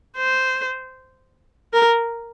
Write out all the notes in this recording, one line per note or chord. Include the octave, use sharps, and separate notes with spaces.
C5
A#4